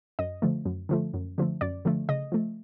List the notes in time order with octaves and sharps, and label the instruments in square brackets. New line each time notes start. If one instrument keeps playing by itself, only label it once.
[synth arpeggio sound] F#2 D#5
D3 F3 A3
F#2
D3 F3 A3
F#2
D3 F3 A3
F#2 D5
D3 F3 A3
C#3 D#5
F3 A3